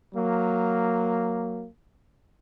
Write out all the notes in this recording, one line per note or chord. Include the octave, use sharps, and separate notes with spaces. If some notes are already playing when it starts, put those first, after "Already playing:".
F#3 A#3